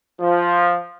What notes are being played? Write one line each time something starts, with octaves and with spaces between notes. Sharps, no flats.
F3